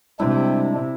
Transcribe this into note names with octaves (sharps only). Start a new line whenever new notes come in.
C3 G3 G#3 D4 E4